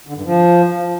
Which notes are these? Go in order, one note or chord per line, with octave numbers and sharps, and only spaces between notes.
D3
G2
F3